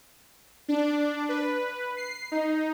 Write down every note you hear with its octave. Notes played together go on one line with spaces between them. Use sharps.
D4
B4
C7
D#4